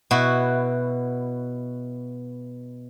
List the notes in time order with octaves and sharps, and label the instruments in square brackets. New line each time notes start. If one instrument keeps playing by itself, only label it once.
[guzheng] B2 E4 F#4